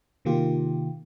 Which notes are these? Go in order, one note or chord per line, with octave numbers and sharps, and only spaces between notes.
C3 D#3 A#3 F4 G4